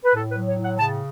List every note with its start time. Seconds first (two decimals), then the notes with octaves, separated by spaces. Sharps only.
0.04 B4
0.15 A2 A4
0.31 B4
0.36 F#3
0.47 C#5
0.58 A2
0.63 F#5
0.78 C#3 A5